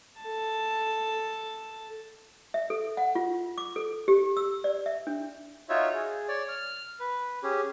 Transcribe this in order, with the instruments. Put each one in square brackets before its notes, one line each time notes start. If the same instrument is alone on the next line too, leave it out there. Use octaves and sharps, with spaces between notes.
[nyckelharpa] A4 A5
[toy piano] E5
A4
F#5
F4
D6
A4
G4
E6
D5
E5
D4
[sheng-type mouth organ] D#4 F4 F#4 C#5 E5
G#4
C#5 D5
F6
B4
C#4 G4 G#4